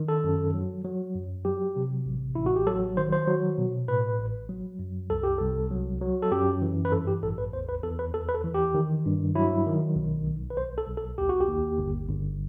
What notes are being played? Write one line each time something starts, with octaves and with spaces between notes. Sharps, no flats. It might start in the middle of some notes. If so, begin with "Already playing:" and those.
Already playing: D#3
A4
F#2
F#3
F#3
F#2
F#3 G4
C3
A1
A1 E4
F#4
G4
F#3 A4
D#3 C5
C5
F#3
B2
A2 B4
A1
F#3
F#2
C2 A4
G4
C2 A4
F#3
F#3
A4
F#2 G4
E3
B4
G2 A4
G4
A1 A4
B4
E2 C5
B4
E2 A4
B4
E2 A4
B4
A4
E3
G4
D#3
G2
F#3 E4
D#3
B1
B1
B4
B1 C5
A4
B1
A4
D#2 G4
F#4
G4
D#2
G1
G1